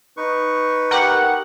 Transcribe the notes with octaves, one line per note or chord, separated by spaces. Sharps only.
D#4 B4 C#6
G4 A#4 F#5